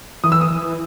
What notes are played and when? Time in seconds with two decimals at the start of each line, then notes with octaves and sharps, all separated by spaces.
0.24 E3 D#6
0.32 E6
0.41 D#6
0.50 E3